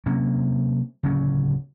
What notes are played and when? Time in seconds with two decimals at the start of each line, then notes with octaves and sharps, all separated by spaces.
0.06 C3 F#3 A#3 C#4
1.03 D1 C#3 F#3 C#4